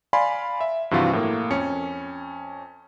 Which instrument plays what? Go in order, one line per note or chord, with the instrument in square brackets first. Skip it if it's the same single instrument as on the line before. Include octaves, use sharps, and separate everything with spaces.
[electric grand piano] D5 F5 G#5 B5 C6
E5
G2 C3 E3 F3 F4 F#4
A2 A#3
F2 C#4 C#7